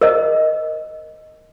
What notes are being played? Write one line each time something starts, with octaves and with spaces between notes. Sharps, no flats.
A#4 C5 D#5